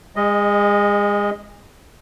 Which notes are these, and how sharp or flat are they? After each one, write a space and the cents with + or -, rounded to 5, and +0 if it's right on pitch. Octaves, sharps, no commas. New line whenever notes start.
G#3 -30 D#5 +0